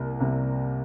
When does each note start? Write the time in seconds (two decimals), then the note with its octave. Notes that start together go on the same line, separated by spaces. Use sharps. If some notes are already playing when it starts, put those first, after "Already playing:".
Already playing: C2 C3 G3 A#3
0.20 C2 C3 G3 A#3